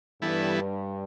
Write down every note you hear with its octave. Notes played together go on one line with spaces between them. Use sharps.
G2 E3 G3 B3 E4 A4